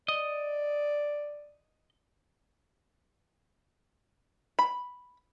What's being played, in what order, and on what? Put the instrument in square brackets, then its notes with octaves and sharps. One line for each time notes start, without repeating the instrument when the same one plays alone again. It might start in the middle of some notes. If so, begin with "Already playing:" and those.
[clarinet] D5 [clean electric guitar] D#5
[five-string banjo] B5